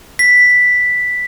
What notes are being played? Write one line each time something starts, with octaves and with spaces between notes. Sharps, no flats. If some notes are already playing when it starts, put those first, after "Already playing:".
B6